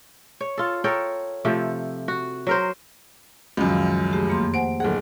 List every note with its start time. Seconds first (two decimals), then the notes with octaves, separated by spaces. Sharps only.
0.41 C#5
0.58 F4 A4
0.84 A4 A#4 C#5 G5
1.45 C3 F3 A3
2.08 F#4
2.47 F#3 A#4 C5
3.57 C#2 F#2 D#3 F3
4.13 A3 G4 G#4
4.28 F2 A#3 C6
4.54 C5 F#5 G#5 D7
4.80 D1 G#4 A4 F#5